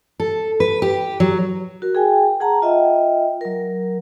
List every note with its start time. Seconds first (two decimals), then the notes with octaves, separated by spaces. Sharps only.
0.20 A4
0.60 B4
0.82 G4
1.20 F#3
1.82 F#4 A#4
1.95 G#4 G5 G#5
2.40 G#4 F#5 A5 A#5
2.62 F4 D#5 E5 G5
3.41 F#3 A#4